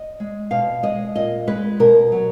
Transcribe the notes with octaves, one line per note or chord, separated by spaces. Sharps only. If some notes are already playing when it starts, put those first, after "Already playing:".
Already playing: D#5
G#3
B2 F5
G#3 D#5
A#2 D#5
G#3 B4
B2 A#4
F#3